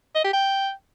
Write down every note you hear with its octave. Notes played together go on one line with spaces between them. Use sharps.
D#5
G4
G5